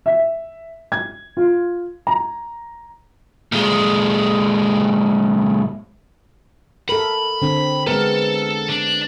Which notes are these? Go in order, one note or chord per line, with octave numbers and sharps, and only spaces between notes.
E5
G#6
F4
A#5
A#2 G#3
A4 A#4 B5
D3 C4
G#3 B3 A4 A#4
D4